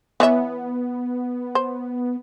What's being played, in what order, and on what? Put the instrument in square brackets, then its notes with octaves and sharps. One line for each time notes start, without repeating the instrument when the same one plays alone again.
[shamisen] E3 C#5 E5 [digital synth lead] B3
[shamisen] C5